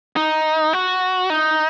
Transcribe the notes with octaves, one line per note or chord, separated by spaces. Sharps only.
D#4
F#4
D#4